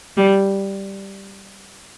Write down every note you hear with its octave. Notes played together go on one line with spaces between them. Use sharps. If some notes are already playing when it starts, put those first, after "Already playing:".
G3